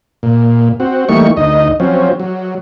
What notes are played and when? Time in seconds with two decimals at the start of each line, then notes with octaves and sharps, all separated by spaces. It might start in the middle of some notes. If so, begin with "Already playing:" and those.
0.23 A#2
0.80 C4 F#4
1.09 E3 G3 A3 A#3 D#4 C#6
1.37 D2 D#4 D#5
1.80 F3 F#3 C4 C#4
2.20 F#3